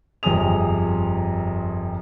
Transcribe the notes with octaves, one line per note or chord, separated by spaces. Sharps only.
G1 F2 C3 G#4 D#6 F7